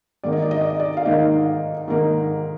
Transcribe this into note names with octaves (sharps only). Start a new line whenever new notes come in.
G#2 D#3 A#3 D#4 D5
D#5
D5
D#5
D5
D#5
D5
F5
G#2 D#3 A#3 D#4 D#5
G#2 D#3 A#3 D#4